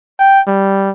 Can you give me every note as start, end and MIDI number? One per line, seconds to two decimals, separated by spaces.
0.19 0.41 79
0.48 0.90 55